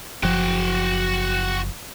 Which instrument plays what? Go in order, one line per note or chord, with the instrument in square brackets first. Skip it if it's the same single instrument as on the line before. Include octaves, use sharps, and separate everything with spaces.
[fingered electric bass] F#1 F3 [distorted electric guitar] F#4 G5